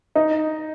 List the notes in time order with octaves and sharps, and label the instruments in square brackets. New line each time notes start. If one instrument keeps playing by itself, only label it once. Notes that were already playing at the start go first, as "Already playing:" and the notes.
[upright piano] D#4